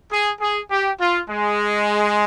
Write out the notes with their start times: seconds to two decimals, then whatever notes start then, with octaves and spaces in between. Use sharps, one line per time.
0.11 G#4
0.41 G#4
0.70 G4
1.00 F4
1.29 G#3